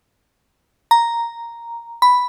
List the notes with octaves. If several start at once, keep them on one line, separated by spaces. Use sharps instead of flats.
A#5
B5